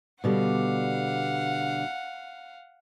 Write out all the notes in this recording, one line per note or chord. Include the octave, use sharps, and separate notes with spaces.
B2 D3 G3 F5 F#5